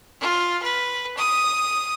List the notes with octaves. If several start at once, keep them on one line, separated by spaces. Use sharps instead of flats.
F4
B4
D#6